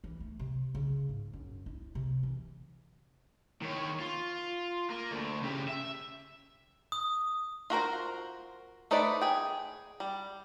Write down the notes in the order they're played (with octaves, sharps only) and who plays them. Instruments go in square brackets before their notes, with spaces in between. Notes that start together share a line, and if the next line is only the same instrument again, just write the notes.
[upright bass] E3
A3
C3
C#3
G#2
F#2
E4
C3
E3
[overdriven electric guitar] D#3 C#5
F4
A#3 A#4
D2 A3
C#3 G4
E5
[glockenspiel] D#6
[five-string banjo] F4 F#4 A#4 C5
A3 D#4 B4 C5 D5
G#4 G5
G3